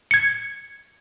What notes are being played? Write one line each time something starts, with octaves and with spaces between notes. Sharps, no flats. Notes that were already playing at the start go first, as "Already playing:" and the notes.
G#6 C#7